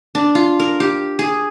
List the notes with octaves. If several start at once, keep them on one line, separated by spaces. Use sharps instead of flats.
D4
F4
A#4
G4
G#4